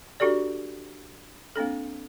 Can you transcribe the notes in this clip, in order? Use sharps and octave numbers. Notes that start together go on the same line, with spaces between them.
D4 F#4 G4 A4 D5
A#3 C4 D4 A4